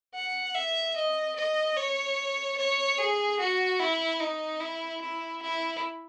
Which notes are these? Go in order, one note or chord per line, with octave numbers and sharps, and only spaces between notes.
F#5
E5
D#5
D#5
C#5
C#5
G#4
F#4
E4
D#4
E4
E4
E4